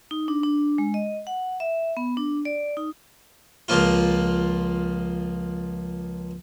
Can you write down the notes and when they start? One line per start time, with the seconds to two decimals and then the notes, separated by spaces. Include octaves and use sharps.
0.11 D#4
0.28 D4
0.43 D4
0.78 G#3
0.94 D#5
1.27 F#5
1.60 E5
1.97 B3
2.17 D4
2.45 D5
2.77 D#4
3.68 C#2 F3 A#3 F4